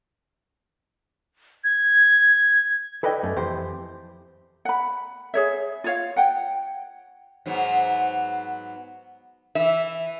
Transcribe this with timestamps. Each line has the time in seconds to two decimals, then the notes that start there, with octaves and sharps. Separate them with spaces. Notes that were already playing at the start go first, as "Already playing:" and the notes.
1.64 G#6
3.03 A4 B4 D5 D#5 G5
3.23 F#2 A3
3.36 F2 E3 G4 C5
4.65 F#5 B5
5.34 G#4 C#5 E5
5.84 F4 C#5 F5
6.16 F#5 G5
7.46 G#2 F#3 B3
9.55 E3 E5